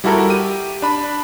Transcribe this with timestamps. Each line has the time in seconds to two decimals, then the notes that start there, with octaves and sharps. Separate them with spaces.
0.04 G3 E4 F#4 A4 A#4
0.30 G4 D#7
0.82 D4 B5